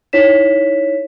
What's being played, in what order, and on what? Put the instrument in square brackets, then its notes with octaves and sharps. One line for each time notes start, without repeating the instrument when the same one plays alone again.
[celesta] D#4 E4 C#5 B6 E7